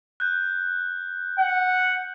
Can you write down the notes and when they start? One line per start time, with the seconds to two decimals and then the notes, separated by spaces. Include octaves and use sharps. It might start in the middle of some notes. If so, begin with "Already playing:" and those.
0.20 F#6 G6
1.39 F#5